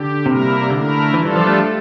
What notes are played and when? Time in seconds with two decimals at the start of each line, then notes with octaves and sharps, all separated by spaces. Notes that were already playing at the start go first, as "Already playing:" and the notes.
Already playing: D3 G4
0.25 C3 G3 A#3 E4 A#4
0.70 D3 A3 E4 A#4
1.14 E3 G3 D4 F4 A4
1.25 E3
1.36 F3
1.47 A3